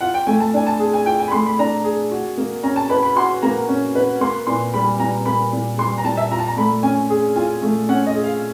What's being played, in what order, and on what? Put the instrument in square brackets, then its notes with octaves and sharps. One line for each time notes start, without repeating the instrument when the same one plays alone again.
[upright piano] F4 [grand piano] F#5
[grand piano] G5
[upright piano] A3 [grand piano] G#5
[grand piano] A5
[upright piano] D4 [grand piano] G#5
[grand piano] A5
[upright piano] G#4
[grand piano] G#5
[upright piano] F4 [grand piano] G5
[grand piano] G#5
B5
[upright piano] A3 [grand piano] C6
[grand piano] B5
[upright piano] D4 [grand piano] A#5
[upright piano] G#4
F#4
A#3
[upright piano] C#4 [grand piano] A#5
[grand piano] A5
[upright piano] B4 [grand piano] B5
[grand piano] B5
[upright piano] F#4 [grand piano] C6
[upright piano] A#3 [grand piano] A#5
[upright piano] C#4
B4
[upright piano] A#3 [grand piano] C6
[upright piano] A#2 [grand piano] C6
[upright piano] G3 [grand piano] B5
[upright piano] A#2 [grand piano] A#5
[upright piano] A#3 [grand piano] B5
[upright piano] A#2
[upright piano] G3 [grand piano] C6
[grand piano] A#5
[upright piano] A#2 [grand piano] A5
[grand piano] E5
[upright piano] F4 [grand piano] A#5
[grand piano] A5
A#5
[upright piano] A3 [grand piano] B5
[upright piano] C#4 [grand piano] G#5
[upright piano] G#4
[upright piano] F4 [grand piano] G#5
[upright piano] A3
[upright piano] C#4 [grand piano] F#5
[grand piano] D#5
[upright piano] G#4
[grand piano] F5